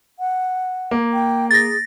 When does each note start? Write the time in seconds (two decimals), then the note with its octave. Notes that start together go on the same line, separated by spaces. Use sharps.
0.19 F#5
0.91 A#3
1.13 G5
1.51 G#4 A6 A#6